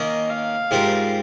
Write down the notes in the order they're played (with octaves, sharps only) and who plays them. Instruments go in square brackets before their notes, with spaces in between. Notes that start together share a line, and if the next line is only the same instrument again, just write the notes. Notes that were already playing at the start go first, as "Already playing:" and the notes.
Already playing: [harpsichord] D#3 A#3 C#4 [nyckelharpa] D#5
[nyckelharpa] F5
[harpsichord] G#2 G3 C4 F4 A#4